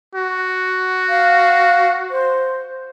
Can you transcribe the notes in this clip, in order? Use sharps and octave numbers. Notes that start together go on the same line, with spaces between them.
F#4
F5
C5